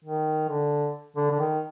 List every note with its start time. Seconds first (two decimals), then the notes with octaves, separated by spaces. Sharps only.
0.04 D#3
0.49 D3
1.17 D3
1.31 D3
1.40 D#3